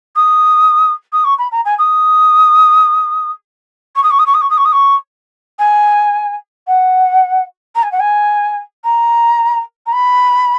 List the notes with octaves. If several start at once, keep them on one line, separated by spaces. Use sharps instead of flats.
D#6
D#6
C#6
B5
A#5
G#5
D#6
C#6
D#6
C#6
D#6
C#6
D#6
C#6
D#6
C#6
D#6
C#6
G#5
F#5
A#5
G#5
F#5
G#5
A#5
A#5
B5